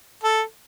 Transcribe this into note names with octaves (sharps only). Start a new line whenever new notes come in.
A4